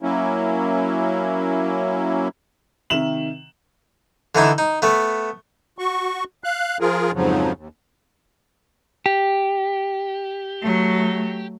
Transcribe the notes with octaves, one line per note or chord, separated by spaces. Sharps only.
F#3 A#3 C#4 E4
C3 D#3 E5 E7 F#7
D3 E3 D#4 E4
D#4
A3 B3
F#4 C#6
F5 F#6
F3 F4 G#4 A#4
F2 G#2 C#3 F3 F#3
D#2
G4
F#3 A3